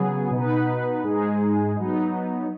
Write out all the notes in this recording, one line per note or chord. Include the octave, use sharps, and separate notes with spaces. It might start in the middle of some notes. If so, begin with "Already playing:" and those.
Already playing: C#3 F#3 B3 G#4
B2 B3 D#4 B4
G#2 G#3 D#4 G#4
F#3 B3 D#4